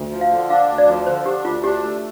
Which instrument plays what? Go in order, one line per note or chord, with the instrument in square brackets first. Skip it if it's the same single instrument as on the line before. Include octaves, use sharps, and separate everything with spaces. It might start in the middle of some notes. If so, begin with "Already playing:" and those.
Already playing: [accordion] D2
F3
[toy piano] F5
[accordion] D3
[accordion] D4 [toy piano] F5
[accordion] D2
[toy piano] D5
[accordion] F3
[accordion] D3 [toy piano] C5
[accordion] D4 [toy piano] G4
[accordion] D2 [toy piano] F4
[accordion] D4 [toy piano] G4
[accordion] A3